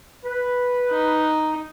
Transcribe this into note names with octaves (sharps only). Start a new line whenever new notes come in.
B4
D#4